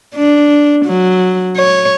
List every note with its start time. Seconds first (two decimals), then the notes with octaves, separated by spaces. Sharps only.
0.15 D4
0.85 F#3
1.56 C#5